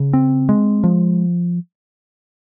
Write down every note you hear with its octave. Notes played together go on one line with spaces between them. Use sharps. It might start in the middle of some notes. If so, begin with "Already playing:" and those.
Already playing: C#3
C4
G#3
F3